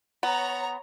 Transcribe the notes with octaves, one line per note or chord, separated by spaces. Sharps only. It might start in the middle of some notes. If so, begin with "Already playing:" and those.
B3 C#5 A#5